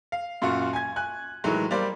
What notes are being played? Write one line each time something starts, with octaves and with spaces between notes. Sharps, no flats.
F5
F#2 A#2 F4 F#4 C#6
G#5 G#6
G#5 F#6
A2 D#3 E3 F#3 G#3
G3 A#3 C5 D5